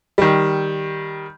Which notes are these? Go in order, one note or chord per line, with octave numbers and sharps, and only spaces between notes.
D#3 G3